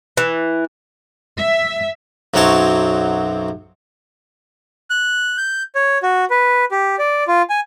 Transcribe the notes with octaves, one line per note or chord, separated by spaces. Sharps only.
E3
E5
B1 F#2 F#3 C4 C#5 A5
F#6
G6
C#5
F#4
B4
G4
D5
F4
G#5